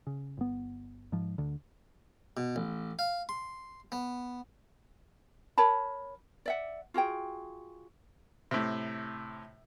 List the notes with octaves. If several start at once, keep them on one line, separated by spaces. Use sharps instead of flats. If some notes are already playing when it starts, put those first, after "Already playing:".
C#3
G1 B3
G#2 F3
D2 D3
B2
A1
F5
C6
B3
A#4 C#5 A5 B5
D5 E5 F#5
F4 F#4 G#4 G5
A2 C3